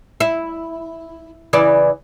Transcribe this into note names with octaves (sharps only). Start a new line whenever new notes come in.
E4
C#3 E3 D5